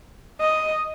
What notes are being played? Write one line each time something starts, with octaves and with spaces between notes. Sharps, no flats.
D#5